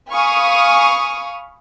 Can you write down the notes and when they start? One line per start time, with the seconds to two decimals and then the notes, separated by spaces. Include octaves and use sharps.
0.11 F5 G#5 B5 C#6 D#6 F6